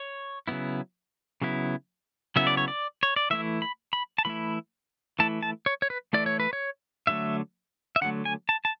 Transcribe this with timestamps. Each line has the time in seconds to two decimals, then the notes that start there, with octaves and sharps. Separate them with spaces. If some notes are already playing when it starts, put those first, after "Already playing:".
Already playing: C#5
0.48 C#3 F#3 B3 E4
1.42 C#3 F#3 B3 E4
2.36 C#3 F#3 B3 E4 E5
2.47 D5
2.57 C#5
2.68 D5
3.03 C#5
3.16 D5
3.30 E3 A3 E4 E5
3.62 B5
3.93 B5
4.18 A5
4.25 E3 A3 E4 B5
5.19 E3 A3 E4 A5
5.43 A5
5.66 C#5
5.82 C#5
5.90 B4
6.13 E3 A3 E4 D5
6.26 C#5
6.40 B4
6.53 C#5
7.07 D3 F#3 A3 E5
7.96 E5
8.01 D3 F#3 A3 F#5
8.25 G#5
8.49 A5
8.65 A5